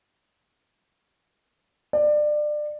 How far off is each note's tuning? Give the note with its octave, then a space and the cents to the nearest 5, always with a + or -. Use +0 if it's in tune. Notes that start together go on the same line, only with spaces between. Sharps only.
D5 +25